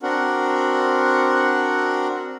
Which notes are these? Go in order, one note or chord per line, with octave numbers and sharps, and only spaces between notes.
C4 D4 F#4 A#4 F#5